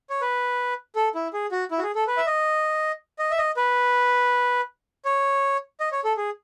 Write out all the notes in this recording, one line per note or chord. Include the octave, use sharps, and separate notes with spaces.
C#5
B4
A4
E4
G#4
F#4
E4
F#4
G#4
A4
B4
E5
D#5
D#5
E5
D#5
B4
C#5
D#5
C#5
A4
G#4